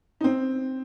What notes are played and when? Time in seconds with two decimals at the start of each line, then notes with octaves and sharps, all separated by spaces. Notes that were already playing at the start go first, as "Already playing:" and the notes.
0.21 D#4
0.24 C4